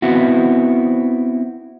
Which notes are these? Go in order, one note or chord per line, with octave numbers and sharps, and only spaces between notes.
B3 C4 E4 F#4